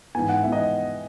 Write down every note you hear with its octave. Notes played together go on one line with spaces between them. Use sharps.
G#2 E3 B3 G#5
F#5
G#2 E3 B3 E5
D#5